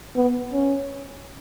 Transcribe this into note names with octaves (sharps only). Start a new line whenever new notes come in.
B3
C#4